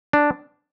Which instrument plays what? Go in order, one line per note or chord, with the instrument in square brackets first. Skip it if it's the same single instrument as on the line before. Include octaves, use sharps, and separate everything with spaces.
[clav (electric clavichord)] D4